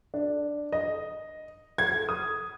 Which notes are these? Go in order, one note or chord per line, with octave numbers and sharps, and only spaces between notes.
D4
D#5
G#6
D#6